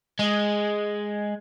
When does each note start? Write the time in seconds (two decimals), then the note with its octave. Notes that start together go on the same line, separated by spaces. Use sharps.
0.19 G#3